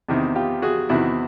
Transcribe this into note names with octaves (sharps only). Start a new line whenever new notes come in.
E2 C3 D#3
F4 G4
F#4 G#4
E2 C3 D#3 E4 F#4